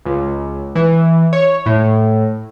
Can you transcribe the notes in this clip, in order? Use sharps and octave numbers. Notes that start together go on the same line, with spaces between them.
C#2
E3
C#5
A2